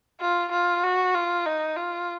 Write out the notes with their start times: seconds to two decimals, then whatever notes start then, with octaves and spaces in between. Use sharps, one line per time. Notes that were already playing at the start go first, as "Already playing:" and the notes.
0.21 F4
0.52 F4
0.84 F#4
1.15 F4
1.46 D#4
1.77 F4